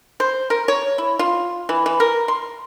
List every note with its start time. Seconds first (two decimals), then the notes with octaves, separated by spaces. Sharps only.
0.20 C5
0.50 A#4
0.68 C#5
0.98 E4
1.19 F4
1.69 E3
1.86 E3
2.00 A#4
2.28 C6